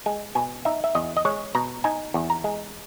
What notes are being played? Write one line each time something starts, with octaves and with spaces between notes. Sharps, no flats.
G#3 G#5
B2 G#5
D#4 E5
E5
E2 D#5
D#5
G#3 C#5
B2 A#5
D#4 G#5
E2
A#5
G#3